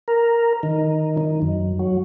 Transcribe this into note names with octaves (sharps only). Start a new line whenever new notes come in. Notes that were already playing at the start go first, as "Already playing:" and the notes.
A#4
D#3
D#3
F#2
F#3